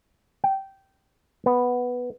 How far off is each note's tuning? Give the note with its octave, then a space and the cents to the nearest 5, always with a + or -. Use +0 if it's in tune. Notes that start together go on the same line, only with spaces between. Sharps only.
G5 -15
B3 +0